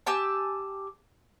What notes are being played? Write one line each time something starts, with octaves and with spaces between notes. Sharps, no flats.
G4 G#5 A5 E6